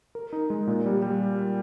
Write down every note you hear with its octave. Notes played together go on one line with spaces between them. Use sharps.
A#4
D#4
G#3
A#2
G3
G3